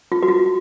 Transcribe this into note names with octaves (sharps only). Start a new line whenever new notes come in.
F4
F#4
F4